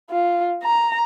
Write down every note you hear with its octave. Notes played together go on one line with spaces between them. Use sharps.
F4
A#5